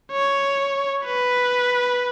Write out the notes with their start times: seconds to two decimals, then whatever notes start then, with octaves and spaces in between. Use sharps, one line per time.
0.12 C#5
1.05 B4